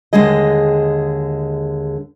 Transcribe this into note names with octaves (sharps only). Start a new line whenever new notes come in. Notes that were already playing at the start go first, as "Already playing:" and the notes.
D#2 D3 G#3 G#4 D#5